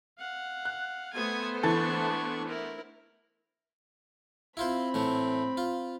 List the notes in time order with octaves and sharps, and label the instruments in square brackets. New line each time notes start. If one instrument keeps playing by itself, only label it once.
[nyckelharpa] F5 F#5
[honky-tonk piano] F#6
[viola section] A3 B3 C5 [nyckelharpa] G#5 D#6
[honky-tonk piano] E3 A4 A6 [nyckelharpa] D4 C#6
[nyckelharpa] E4 A#4
[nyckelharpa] C4 B5 [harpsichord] E4 F4 C5
[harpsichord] A2 E3 A3
F4